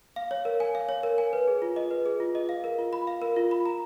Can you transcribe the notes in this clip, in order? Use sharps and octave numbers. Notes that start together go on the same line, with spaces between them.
F5
C#5
A#4
G#5
F5
C#5
A#4
G#5
B4
G#4
F4
D#5
B4
G#4
F4
D#5
F5
A#4
F4
B5
F5
A#4
F4
B5
A#5